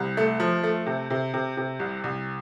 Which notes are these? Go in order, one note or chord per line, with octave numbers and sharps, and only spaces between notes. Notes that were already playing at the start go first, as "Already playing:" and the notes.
Already playing: C2
A3
F3
A3
C3
C3
C3
C3
C2
C2